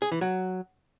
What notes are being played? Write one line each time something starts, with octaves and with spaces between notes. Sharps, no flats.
G#4
E3
F#3